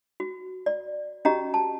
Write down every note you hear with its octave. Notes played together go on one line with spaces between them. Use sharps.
F#4
D5
C#4 F#4 G4 D#5 A#5
A5